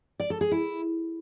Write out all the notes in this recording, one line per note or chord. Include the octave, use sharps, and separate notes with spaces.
D5
A4
G#4
E4